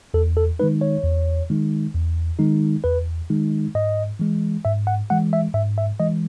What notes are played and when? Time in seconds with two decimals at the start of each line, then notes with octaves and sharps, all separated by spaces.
0.14 E2 A4
0.37 A4
0.59 D#3 G#3 D#4 B4
0.81 C#5
1.04 E2
1.50 D#3 G#3 D#4
1.94 E2
2.39 D#3 G#3 D#4
2.84 E2 B4
3.30 D#3 G#3 D#4
3.75 G#2 D#5
4.19 E3 G#3
4.65 G#2 E5
4.87 F#5
5.10 E3 G#3 F#5
5.33 E5
5.54 G#2 E5
5.78 E5
6.00 E3 G#3 D#5